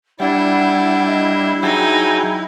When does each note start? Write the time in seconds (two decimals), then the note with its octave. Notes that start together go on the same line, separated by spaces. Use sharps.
0.20 G3 D4 E4 F#5
1.07 D#5
1.63 F#3 D#4 G#4 G5 G#5